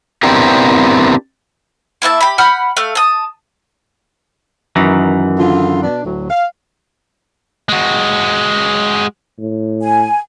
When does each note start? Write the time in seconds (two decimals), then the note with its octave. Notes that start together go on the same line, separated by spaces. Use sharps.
0.23 B3 C4 D4 E4 G4 A#4
2.02 A#3 E4 E5 A5
2.21 G4 B5
2.38 F#5 B5 F6 G6
2.76 A3 F5
2.95 A5 D#6
4.76 F#2 D#3 E3
5.39 D3 F4
5.82 B2 D4
6.04 D2 A2 F#3
6.30 F5
7.69 G#3 F#4
9.39 A2
9.83 G#5